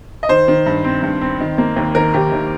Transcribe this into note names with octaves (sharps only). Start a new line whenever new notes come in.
D#5
D#3 C5
D#3
G2
C4
G2
C4
D#3
A#3
D#2
D#3 A#4
D#2 G4
D#2